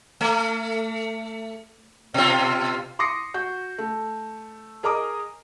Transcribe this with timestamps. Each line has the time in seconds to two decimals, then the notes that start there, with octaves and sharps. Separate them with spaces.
0.21 A3
2.14 B2 F4
2.99 C6 D6 D#6 A#6 C7 C#7
3.34 F#4 G6
3.78 A3
4.83 G#4 A#4 D#5 A#5 D6 D#6